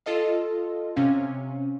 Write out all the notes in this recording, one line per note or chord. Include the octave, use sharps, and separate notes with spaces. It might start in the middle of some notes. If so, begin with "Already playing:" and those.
F4 A4 D#5 F5
C3 C4 C#4 F5